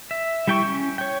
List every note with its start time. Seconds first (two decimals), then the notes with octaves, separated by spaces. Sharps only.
0.11 E5
0.47 G3 E4 G5 G#5 C#6
0.65 C#4
0.98 C#5 G5